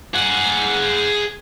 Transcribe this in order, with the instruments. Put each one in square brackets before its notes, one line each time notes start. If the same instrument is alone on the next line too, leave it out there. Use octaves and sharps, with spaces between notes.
[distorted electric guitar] G#4 F#5